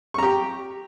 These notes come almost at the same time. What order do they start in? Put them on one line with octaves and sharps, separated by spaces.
C#6 A#5 G4